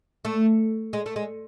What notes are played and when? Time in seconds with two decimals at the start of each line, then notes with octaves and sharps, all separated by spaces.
0.25 A3
0.93 G#3
1.06 A3
1.16 G#3